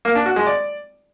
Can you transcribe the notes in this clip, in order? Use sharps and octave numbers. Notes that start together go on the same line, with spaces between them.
A#3
D4
F#4
G#3
D5